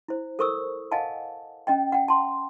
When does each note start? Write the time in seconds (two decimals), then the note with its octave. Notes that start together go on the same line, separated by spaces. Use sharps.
0.08 E4 C5
0.39 A4 A#4 C5 C#6 D#6 E6
0.92 D#5 F5 F#5 G#5 A5
1.67 C#4 D#5 G5
1.92 F#5 G5
2.08 A5 C6